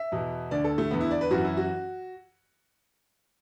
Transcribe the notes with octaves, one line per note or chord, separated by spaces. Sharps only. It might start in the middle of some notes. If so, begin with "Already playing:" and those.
Already playing: E5
E2 B2
D2 D3 D5
A4
A3
E2 D3 B3
E4
D5
B4
F#2 E3 F#4
E4
F#4